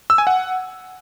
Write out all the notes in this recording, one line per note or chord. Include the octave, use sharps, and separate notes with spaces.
E6
G#5
F#5